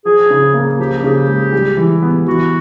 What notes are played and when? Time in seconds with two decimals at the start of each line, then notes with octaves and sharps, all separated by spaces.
0.05 F3 G#4
0.31 C#3
0.54 A#3
0.79 F3 G4
1.04 C#3
1.28 G#3
1.53 G3
1.77 E3
2.03 B3
2.26 E3 F#4